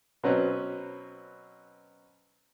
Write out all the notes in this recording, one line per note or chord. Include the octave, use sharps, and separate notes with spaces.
B2 F#3 C4 C#4 B4